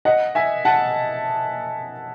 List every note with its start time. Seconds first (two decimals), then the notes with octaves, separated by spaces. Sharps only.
0.05 D#5 F#5
0.35 E5 G#5
0.65 F#5 A5